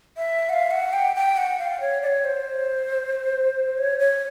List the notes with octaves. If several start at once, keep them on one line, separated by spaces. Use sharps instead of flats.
E5
F#5
F5
F#5
G5
G5
F#5
F5
C#5
D5
C#5
C5
C#5
C#5